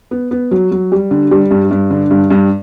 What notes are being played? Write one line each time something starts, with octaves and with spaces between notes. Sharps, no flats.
B3
B3
F#3
F#3
G3
D3
G3
G2
G2
D3
G2
G2